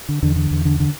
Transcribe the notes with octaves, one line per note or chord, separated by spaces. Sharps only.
D3
E2 D3
D3
E2
D3
D3